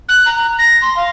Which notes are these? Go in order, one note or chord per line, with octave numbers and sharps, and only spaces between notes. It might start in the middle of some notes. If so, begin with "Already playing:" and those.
F#6
A#5
A#6
C6
F5